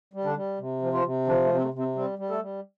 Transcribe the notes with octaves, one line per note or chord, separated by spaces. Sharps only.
G3
D3 D4
G3
C3
F3
F3 F4
C3
D3 F3 D4
A3
C3
C4
A3
C3 C4
G3 C4
G3
A3 A4
G3